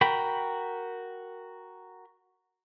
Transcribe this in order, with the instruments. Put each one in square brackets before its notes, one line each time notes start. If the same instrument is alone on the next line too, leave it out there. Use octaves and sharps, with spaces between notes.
[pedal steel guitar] F#4 A#4 G5 B5